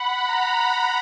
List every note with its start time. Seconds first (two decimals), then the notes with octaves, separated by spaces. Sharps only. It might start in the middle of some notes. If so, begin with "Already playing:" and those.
Already playing: F#5 B5
0.28 A#5
0.70 B5